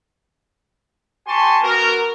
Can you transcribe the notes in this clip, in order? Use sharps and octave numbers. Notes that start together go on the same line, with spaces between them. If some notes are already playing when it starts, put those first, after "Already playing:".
G4 G#5 A5 C6 C#6
B3 F#4 A#4